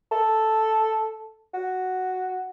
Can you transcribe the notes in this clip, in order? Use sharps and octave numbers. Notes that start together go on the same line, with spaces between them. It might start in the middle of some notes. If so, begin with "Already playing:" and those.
A4
F#4